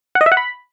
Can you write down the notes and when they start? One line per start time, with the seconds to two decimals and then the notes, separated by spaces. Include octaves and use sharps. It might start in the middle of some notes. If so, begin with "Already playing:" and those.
0.15 F#5
0.21 D#5
0.26 E5
0.32 F#5
0.37 B5